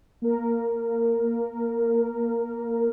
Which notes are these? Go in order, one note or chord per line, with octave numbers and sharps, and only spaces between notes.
A#3 A#4